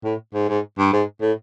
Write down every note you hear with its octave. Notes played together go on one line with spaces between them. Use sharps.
A2
G#2
G#2
G2
G#2
A2